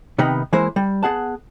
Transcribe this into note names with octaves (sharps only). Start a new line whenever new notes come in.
C3 D#3 B3 D#4 B5
E3 G#3 A#3 E4 C5
G3
B3 G#4 F#5 A5